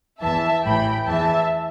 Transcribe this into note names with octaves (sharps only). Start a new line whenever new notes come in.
E2 E3 E5 A5
A1 A2 E3 G5 B5
E2 E3 E5 A5